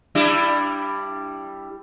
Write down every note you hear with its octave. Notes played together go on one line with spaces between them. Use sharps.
G3 D4 E4